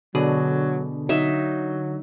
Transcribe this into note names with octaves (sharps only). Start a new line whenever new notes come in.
B2 D3 F#3 G#4 D5
F#3 D#4 E5